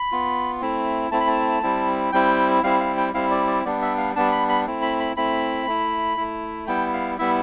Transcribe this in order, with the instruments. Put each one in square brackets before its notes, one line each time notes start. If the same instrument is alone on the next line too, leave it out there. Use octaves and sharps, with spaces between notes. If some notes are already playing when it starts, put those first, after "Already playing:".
Already playing: [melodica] B5
B3 F4
A3 C4 E4
A3 C4 E4 A5
B5
A5
G3 C4 E4
G3 C4 E4 G5
G3 C4 E4 F5
F5
G5
G3 C4 E4 F5
D5
D5
G3 B3 D4 D5
E5
F5
G3 B3 D4 A5
B5
B5
A3 C4 E4
B5
B5
A3 C4 E4 B5
A3 E4
A3 E4
G3 B3 E4 G5
F5
G3 B3 E4 E5